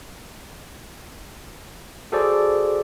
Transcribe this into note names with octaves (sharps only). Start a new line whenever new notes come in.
F#4 G#4 A4 C5 D5